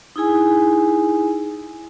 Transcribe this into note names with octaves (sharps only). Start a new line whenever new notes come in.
D#4 E4 G#4 G#5